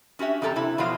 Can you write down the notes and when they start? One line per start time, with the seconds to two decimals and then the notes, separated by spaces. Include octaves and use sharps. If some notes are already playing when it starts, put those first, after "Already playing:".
0.19 C#4 F#4 G4 E5
0.42 F2 C3 G4 A4 A#5
0.56 C3 E4
0.78 B2 F3 F#3 F4 F5